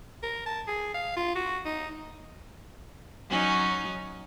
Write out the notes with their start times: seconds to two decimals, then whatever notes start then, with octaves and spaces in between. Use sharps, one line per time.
0.23 A#4
0.46 A5
0.67 G#4
0.95 F5
1.17 F4
1.36 F#4
1.66 D#4
3.29 F#3 C#4 D#4